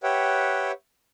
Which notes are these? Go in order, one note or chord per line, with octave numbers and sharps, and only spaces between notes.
G4 B4 C#5 E5 F#5 G5